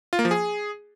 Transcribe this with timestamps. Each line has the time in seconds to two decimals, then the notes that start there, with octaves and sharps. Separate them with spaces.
0.13 F4
0.19 A#3
0.25 F3
0.31 G#4